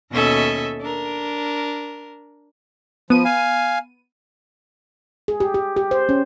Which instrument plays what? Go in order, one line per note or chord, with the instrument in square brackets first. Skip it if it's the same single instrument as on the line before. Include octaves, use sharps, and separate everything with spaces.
[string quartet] D#2 B2 C#4 A4 D#5 E5
D4 A#4
[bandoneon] F3 [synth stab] B3 D#7
[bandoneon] F5 G#5
[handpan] G#4
G4
G4
G4
C5
C#4